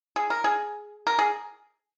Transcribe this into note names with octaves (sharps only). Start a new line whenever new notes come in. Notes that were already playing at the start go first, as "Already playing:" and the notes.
G#4
A#4
G#4
A#4
G#4